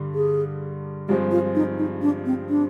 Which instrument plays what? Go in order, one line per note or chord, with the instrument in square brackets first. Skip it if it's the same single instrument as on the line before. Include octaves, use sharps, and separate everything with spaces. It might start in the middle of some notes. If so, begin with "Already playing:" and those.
Already playing: [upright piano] G2 D3 G3
[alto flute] G#4
[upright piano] G2 F3 G#3 C4 [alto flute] G4
[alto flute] F4
D#4
D#4
D4
C4
D4